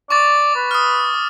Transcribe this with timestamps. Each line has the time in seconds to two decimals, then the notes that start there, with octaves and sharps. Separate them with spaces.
0.10 D5 C#6 D6 A6
0.55 B4
0.71 D#6 F6
1.14 D6